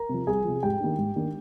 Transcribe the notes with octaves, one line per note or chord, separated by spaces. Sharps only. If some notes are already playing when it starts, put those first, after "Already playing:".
Already playing: A#4 A#5
C3 F3
C2 G#4 G#5
C3 F3
G#2 G4 G5
D#3 A#3 D4
G#2
D#3 A#3 D4